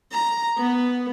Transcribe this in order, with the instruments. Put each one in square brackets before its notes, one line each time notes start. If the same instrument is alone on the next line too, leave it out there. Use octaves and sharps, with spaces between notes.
[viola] A#5
B3